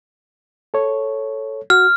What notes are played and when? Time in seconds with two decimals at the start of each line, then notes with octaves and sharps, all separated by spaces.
0.74 A4 C#5
1.70 F#4 F6